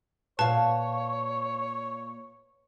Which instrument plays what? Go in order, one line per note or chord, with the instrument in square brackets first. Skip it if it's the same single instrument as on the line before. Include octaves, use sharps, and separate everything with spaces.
[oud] A#2 F5 [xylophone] B4 A5 [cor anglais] C#5